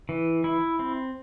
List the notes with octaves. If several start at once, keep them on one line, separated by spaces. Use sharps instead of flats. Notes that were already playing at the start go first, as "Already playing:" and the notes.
E3
E4
C4